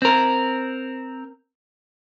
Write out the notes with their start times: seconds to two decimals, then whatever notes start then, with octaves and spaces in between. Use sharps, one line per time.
0.02 C4 A#4